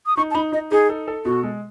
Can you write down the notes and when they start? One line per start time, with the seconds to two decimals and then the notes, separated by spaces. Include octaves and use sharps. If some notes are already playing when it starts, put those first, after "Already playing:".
0.06 D#6
0.17 D#4 C#6
0.31 A5
0.35 D#4 B5
0.52 D#4 D#5
0.71 D#4 G#4
0.89 A4
1.08 A4
1.25 B2 F#4
1.43 G#3